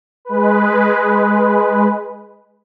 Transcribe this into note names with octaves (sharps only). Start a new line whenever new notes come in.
G#3 B4